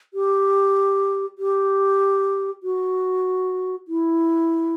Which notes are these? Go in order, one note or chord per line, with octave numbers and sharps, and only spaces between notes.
G4
G4
F#4
E4